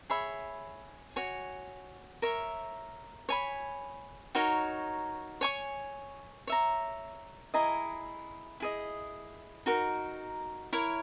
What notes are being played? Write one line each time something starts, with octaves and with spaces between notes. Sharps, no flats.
G#4 C#5 E5 B5
F#4 C#5 G#5
A#4 C#5 E5
C#5 G#5 B5
D#4 F#4 A#4 C#5
C#5 G#5 C#6
C#5 E5 A#5
E4 G#4 D#5 A#5
E4 G#4 D#5
D#4 F#4 A#4
E4 A#4 C#5